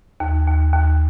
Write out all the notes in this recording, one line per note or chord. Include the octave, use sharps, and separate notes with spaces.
D#2
D#2
D#2